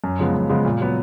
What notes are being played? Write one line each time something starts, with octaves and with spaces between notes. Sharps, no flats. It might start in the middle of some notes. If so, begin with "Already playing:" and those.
F#2
C#3 F3 G#3 B3
F#2
C#3 F3 G#3 B3
A#2
F#3 B3